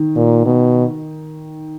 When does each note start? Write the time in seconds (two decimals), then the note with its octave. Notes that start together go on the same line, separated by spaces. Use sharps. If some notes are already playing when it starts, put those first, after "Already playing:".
Already playing: D#3
0.16 A#2
0.45 B2